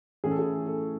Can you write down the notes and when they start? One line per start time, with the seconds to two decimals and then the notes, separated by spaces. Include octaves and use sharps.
0.24 A2 E3 A3 C#4 G#4
0.31 A4
0.39 G#4
0.66 A4